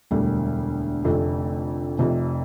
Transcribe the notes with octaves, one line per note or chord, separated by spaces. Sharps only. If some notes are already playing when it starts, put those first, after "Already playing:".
E1 D2 D3 G3
F1 F2 D3 A3
F1 F2 C3